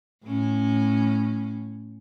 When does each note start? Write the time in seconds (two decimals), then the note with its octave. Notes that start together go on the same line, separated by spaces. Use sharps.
0.24 A2 C#4